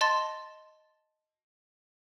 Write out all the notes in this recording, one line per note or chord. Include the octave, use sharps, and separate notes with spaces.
D#5 A5 C6 A6